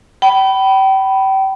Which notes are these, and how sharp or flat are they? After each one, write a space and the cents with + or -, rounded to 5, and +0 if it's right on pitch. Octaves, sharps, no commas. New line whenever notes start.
G5 -30 B5 +0